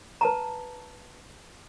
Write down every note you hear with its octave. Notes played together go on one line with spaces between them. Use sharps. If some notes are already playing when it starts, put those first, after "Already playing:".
B4 A5 A#5